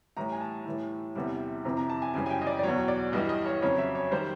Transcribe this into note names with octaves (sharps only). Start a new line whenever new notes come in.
A2 E3 G3 A#5
G#5
A5
A2 E3 G3
E2 C3 E3 G3
F2 C3 E3 A#5
A#5
A5
G#5
F#2 C#3 E3 G3 G#5
G#5
G5
D#5
D5
D5
E2 B2 F#3 C#5
D5
G2 E3 G3 D#5
D#5
C#5
F2 C#3 F#3 C#5
E5
C#5
D#3 G3 C5